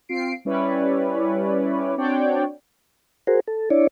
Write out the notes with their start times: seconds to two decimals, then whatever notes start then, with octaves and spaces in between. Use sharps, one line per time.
0.09 C4 F4 C7 D7
0.45 G3 C#4 E4 B4 C#5 D5
1.97 C4 D4 F#4 C#5 D5 G5
3.27 F#4 G#4 A#4 C5
3.47 A4
3.70 D4 E4 C#5 D5